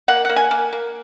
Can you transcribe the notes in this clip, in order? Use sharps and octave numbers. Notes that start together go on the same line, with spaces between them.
A#3 F#5
A#3 F#5
G#5
A#3
A#3